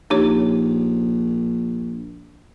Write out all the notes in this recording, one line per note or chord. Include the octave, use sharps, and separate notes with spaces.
A#1 D#4 G4 C#5